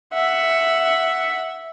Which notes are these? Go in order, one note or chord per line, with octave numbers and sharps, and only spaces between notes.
E5 F#5